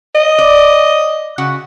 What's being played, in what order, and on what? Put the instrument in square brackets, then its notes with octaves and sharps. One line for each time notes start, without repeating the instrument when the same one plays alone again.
[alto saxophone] D#5
[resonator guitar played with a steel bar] D5
C#3 F#4 F#5